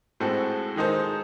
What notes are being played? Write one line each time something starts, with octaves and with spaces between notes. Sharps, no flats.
A2 G#3 C4 F#4 A4
D#3 G#3 D#4 A4 C5